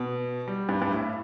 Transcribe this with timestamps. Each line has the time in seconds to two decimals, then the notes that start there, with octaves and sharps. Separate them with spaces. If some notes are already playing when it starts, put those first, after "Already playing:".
Already playing: B2
0.48 G3
0.69 G2
0.82 G2
0.90 A2